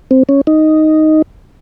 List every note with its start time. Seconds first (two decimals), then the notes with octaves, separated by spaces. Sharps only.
0.11 C4
0.29 C#4
0.47 D#4